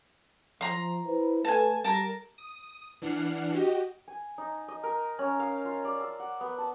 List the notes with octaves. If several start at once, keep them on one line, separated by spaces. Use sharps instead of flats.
F3 A#5 C6
E4 B4 C5
A3 A4 B4 G#5 A5
G3 A#4 A5
D#6
E3 D4 F#5 F6 C7
F#4 G4 D#5
G#5
D#4
D#5
A#4
C#4
F5
F4
D5
E6
F#5
B3
A5